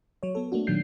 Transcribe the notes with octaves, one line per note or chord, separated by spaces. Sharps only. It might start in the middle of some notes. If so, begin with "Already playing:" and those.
F#3 C#5
B3 A4
A3 A#3 D4 F#4
A#2 D#3 F#3 D4 G6 C7